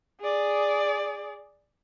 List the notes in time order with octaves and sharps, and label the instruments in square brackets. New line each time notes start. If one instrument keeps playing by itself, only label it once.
[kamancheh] G#4 D5